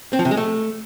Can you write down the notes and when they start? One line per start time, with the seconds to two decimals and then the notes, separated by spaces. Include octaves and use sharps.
0.13 C4
0.19 F3
0.25 C3
0.31 G#3
0.37 A3